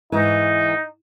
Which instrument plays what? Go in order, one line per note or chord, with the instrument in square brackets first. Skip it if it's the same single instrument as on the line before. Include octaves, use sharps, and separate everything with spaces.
[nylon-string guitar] G#2 E3 [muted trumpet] D#4